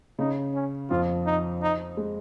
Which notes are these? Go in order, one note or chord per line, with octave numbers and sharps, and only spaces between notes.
C#3 D#4
C#4
F2 F3 F4
D#4
D#4
G#3